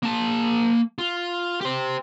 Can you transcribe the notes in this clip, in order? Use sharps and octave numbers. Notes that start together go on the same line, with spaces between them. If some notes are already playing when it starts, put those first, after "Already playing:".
A#3 A5
F4
G4 C5